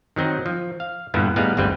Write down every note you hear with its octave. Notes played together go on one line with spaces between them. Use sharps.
D#3 F#3 C4 D#4
F3
F5
G2 A#2 D3 G3 B3 E4
A2 G3 B3 D#4 G#4 F5
G1 D2 G3 C4 B4